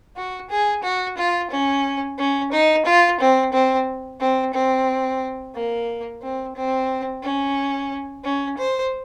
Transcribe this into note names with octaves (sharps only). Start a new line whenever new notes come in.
F#4
G#4
F#4
F4
C#4
C#4
D#4
F4
C4
C4
C4
C4
A#3
C4
C4
C#4
C#4
C5